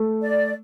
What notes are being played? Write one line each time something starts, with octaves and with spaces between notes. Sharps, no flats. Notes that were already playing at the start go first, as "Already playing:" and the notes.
Already playing: A3
D5